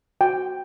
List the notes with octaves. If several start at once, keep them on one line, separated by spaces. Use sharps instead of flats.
F#4 G5